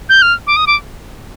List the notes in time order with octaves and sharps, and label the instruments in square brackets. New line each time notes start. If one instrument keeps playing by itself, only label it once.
[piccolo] G6
F6
D6
D#6
D6